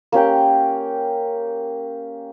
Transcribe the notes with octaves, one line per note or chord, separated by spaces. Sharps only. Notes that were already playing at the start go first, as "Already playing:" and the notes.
A#3 C#4 G4 G5